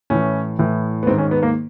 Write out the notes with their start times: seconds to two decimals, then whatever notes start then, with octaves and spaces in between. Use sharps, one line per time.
0.10 A2 E3 C#4
0.59 A2 E3
1.03 B3
1.07 G#2 C4
1.11 D#3
1.18 C#4
1.31 B3
1.43 A#3